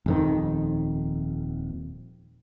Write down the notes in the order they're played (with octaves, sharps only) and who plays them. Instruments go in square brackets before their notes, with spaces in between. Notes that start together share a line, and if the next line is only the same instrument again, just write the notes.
[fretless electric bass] D#1 F2 D#3